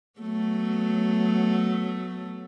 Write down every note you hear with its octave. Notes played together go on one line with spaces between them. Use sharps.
F#3 A3 B3